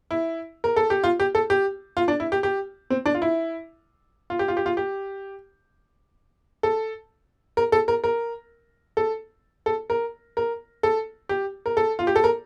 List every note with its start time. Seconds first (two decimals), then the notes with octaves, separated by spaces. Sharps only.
0.11 E4
0.64 A#4
0.76 A4
0.90 G4
1.04 F4
1.20 G4
1.35 A4
1.50 G4
1.97 F4
2.08 D4
2.20 E4
2.32 G4
2.43 G4
2.90 C4
3.06 D4
3.15 F4
3.22 E4
4.30 F4
4.39 G4
4.48 F4
4.57 G4
4.66 F4
4.77 G4
6.63 A4
7.57 A#4
7.72 A4
7.88 A#4
8.04 A#4
8.97 A4
9.66 A4
9.90 A#4
10.37 A#4
10.83 A4
11.29 G4
11.66 A#4
11.77 A4
11.99 F4
12.07 G4
12.16 A4
12.24 A#4